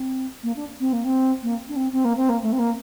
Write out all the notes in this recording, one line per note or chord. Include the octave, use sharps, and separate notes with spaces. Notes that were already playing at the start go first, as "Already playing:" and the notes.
Already playing: C4
A#3
D4
C4
A#3
C4
A#3
D4
C4
C4
A#3
C4
A#3
A3
C4
A#3